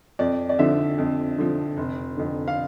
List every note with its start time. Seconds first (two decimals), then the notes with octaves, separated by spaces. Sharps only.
0.19 F2 D5
0.49 D5
0.59 D3 F3 E5
0.98 F2
1.38 D3 F3
1.77 F1
2.17 F2 D3
2.48 F5